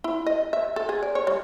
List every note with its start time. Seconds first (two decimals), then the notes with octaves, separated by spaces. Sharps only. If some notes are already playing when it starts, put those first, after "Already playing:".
0.04 E4
0.27 D#5
0.53 E5
0.76 A4
0.89 G#4
1.03 D5
1.15 C#5
1.27 G3